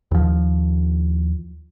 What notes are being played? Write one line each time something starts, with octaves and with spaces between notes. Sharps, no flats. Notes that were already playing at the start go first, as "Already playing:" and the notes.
D#2 F3